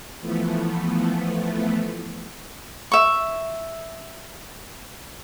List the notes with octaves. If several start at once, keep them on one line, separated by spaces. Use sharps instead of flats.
E3 F3 A3 B3
E5 C#6